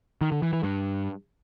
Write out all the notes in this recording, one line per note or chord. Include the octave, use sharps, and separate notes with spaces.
D#3
D3
E3
E3
G2